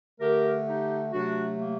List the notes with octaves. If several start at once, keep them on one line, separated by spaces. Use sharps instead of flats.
D3 A3 G4 A#4
D#4 G4
C3 F#3 A3 D4 F#4
A#3